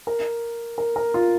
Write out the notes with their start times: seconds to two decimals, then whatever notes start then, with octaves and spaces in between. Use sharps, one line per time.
0.07 A#4
0.78 A#4
0.96 A#4
1.14 F4